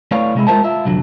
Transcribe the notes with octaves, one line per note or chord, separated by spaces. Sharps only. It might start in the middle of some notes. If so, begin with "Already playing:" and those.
A3 E4 B4 C#5 D5 F5
C3 G#3 E4
G#3 F4 A#4 C5 E5 A5
F4 E5
C2 F2 D3 F#3